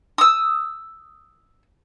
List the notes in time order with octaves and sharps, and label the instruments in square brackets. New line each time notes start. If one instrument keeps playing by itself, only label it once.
[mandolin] D#6 E6